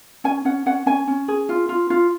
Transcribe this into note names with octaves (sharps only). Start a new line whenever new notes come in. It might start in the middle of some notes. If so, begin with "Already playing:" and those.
C#4 G#5
C#4 F#5
C#4 F#5
C#4 G#5
C#4
G#4
F4
F4
F4